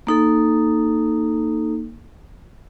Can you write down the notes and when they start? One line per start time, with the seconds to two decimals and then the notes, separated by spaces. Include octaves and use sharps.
0.07 A#3 D#4 A4